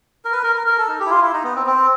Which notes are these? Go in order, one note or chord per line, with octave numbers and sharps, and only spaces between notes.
A#4
B4
A#4
A#4
A#4
A4
D#4
G4
E4
F4
E4
D#4
B3
C4
C4